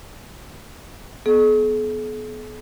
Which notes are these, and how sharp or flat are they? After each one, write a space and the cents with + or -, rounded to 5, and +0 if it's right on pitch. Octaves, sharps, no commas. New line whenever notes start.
B3 +0 G#4 +45